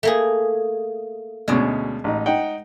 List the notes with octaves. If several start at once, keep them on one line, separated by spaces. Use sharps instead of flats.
A3 A#3 G#4
D2 B2 G#3 C#4 D5
A1 D#4
D#4 F#5 G5